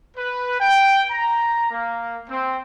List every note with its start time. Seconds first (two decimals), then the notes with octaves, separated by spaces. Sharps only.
0.17 B4
0.61 G5
1.10 A#5
1.71 A#3
2.29 C4